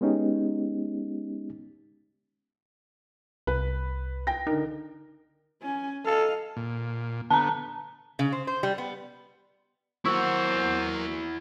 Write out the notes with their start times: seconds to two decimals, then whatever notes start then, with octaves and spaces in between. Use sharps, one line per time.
0.01 G#3 B3 C#4 D#4 G4
3.47 C2 B4
4.27 G5 A#6
4.47 D3 D#4 A#4
5.62 C#4 G#5
6.05 A4 D#5 F5
6.57 A#2
7.31 D3 B3 A5 A#5
8.19 C#3
8.32 C5
8.47 C5
8.63 G3
8.78 B3
10.05 F#3 A#3 E4 C5 F#5 C#6 E6